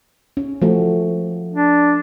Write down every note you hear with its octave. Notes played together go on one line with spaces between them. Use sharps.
C#4
F3 A3 F#4
D4